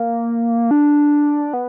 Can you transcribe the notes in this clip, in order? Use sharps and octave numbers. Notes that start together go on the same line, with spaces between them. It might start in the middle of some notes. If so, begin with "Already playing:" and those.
Already playing: A#3
D4
B3